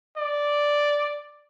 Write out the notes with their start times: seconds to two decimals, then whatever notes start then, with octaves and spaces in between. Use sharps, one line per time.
0.17 D5